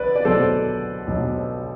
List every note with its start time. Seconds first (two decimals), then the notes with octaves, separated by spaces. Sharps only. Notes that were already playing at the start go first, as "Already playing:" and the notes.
Already playing: B1 B4 D5
0.16 D5
0.25 B1 B2 F#3 A4 C5
1.07 B1 B2 F#3